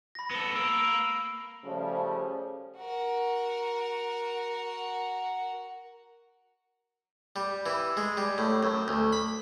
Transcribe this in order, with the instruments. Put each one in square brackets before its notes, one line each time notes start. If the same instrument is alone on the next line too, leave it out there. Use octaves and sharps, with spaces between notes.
[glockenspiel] B5 A#6
[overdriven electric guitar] B3 A4
[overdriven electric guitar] A#3 A#4 [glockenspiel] E6
[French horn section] C#3 F3 G3 A3 C#4
[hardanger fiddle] F#4 A#4
[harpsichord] G3
E3
G#3
G3
A2
F#2
D2
B5